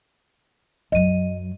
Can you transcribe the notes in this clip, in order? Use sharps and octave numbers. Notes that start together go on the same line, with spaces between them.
F#2 F#3 D#5 D#7